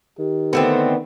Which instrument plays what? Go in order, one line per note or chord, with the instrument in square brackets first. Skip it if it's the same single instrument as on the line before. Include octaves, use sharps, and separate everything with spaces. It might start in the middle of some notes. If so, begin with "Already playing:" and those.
[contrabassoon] D#3 [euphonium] G4
[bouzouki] D3 A3 C4 [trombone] B3